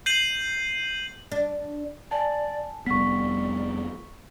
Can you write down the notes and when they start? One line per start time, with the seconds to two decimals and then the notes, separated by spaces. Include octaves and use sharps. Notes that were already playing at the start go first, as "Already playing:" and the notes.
0.06 G6 C7 D#7 F#7
1.32 D4
2.11 D5 G#5 A5
2.86 F1 G3 B3 C#6 B6